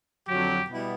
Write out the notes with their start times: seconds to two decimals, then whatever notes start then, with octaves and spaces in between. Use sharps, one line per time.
0.27 F2 D3 F#3 G4
0.67 B2 G3 B3 E4